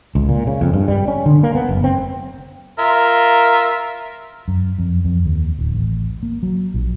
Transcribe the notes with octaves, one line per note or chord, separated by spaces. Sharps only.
C#2
A#2
C#3
F2
G2
G3
C#4
D3
A#3
B3
F#1
C4
F4 A#4 E5
F#2
F2
F2
D#2
D1
A1
A#3
F#3
A#1